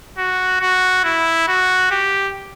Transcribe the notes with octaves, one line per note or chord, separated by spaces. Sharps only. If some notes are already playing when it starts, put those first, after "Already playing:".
F#4
F#4
E4
F#4
G4